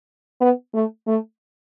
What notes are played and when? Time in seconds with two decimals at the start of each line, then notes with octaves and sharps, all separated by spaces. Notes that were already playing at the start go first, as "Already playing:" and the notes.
0.41 B3
0.74 A3
1.07 A3